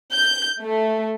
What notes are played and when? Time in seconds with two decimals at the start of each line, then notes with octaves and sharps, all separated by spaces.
0.13 G6
0.62 A3